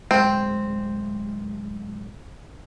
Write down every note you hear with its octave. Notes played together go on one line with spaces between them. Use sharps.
D1 G#3 C4